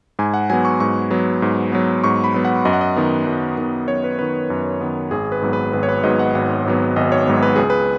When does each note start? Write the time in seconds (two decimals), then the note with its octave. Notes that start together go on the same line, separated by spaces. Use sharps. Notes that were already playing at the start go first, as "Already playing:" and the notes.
0.19 G#2 G#5
0.34 F#5
0.50 F#3 B3 G#5
0.65 C#6
0.80 G#2 C#6
1.11 F#3 B3
1.42 G#2
1.72 F#3 B3
2.04 G#2 C#6
2.24 B5
2.34 F#3 B3
2.45 F#5
2.65 F#2 D#5
2.73 F#5
2.81 D#5
2.96 D#3 B3
3.27 F#2
3.58 D#3 B3
3.88 F#2 C#5
4.04 B4
4.19 D#3 B3 B4
4.50 F#2
4.81 D#3 B3
5.11 G#1 G#4
5.32 B4
5.42 G#2 F#3 B3
5.53 B4
5.73 G#1 B4
5.83 C#5
5.89 B4
6.03 G#2 F#3 B3 D#5
6.19 F#5
6.35 G#1 F#5
6.65 G#2 F#3 B3
6.96 G#1 D#5
7.12 C#5
7.27 G#2 F#3 B3
7.43 B4
7.56 C#2 G#4
7.70 B4